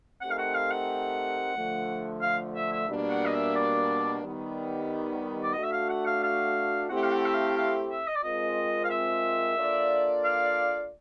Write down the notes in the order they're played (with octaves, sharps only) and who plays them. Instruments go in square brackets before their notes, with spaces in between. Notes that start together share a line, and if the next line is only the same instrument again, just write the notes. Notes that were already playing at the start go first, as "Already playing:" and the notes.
[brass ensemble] A3 C4 D#4 G4 A#4 [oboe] F#5
[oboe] F5
F#5
F5
F#5
[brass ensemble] D3 F3 A3
[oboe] F5
E5
E5
[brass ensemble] B2 G3 A#3 D4
[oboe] F#5
D#5
E5
D5
[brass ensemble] D#3 G3 B3 D#4
[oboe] D5
[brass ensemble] A3 D4 F#4 [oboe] D#5
[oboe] E5
F5
F#5
F5
F5
[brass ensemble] A3 C4 E4 G4 [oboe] F#5
[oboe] F5
F#5
E5
F5
F5
E5
D#5
D5
[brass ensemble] G#3 C4 F4 A#4 [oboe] D#5
[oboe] F5
E5
[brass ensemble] A#3 D4 F4 A4 D5
[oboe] F5